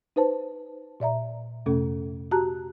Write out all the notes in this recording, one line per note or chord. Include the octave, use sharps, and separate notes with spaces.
D#4 B4 C5 A5
A#2 D5 E5 A#5
F2 C3 A3 C#4 A4
F#4 G4 A5 A#5 F#6